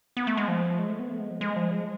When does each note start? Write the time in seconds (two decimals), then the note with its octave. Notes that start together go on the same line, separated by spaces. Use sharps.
0.17 B3
0.27 A3
0.37 G#3
0.48 F3
0.79 G#3
0.89 A3
1.00 B3
1.10 A3
1.20 G#3
1.31 F3
1.41 G#3
1.56 F3
1.71 G#3